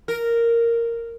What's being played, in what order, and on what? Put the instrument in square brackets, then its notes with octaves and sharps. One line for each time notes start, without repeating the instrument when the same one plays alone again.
[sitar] A#4